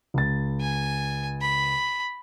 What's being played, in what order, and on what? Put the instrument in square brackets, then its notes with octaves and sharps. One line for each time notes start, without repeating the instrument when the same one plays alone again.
[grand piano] C#2 A6
[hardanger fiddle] G#5
B5